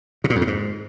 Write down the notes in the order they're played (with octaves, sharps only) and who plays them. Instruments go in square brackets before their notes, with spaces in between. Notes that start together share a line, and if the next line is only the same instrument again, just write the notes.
[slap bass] C3
A#2
F2
A2
G#2